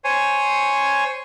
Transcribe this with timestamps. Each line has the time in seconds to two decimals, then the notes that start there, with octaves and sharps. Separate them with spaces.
0.05 C5 C#5 G#5